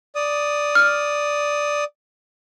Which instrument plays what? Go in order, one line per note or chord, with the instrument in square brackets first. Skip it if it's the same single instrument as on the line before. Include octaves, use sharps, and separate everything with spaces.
[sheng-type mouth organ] D5 D#6
[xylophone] F6